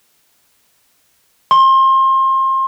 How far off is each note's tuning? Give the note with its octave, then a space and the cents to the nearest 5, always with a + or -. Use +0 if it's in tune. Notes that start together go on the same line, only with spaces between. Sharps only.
C6 +30